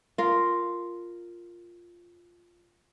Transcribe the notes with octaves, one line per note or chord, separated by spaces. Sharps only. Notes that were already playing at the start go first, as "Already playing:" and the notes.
F4 A#4